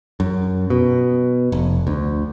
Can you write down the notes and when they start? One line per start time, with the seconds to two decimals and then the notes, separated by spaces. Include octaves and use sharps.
0.20 F#2
0.70 B2
1.52 F1
1.87 D2